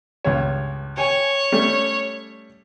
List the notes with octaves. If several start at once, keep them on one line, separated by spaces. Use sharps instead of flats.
C#2 G2 C#5
C#5 G5 G#5
G3 A3 C#4